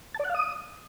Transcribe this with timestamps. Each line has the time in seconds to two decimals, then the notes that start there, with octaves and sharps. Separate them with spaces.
0.14 A5
0.19 D5
0.24 F#5
0.29 F5
0.34 D#6